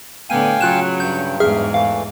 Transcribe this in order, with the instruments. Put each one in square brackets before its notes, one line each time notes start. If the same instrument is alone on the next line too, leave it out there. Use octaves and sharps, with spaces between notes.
[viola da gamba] A2 D3 B3 [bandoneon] F5 G5 G#5 [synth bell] D#7
[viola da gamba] C#3 F#3 [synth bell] F4 F#6 E7
[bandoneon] G2 [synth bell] G6
[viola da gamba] E2 G#2 [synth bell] G#4 E5 F6
[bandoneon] E3 A3 [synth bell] F5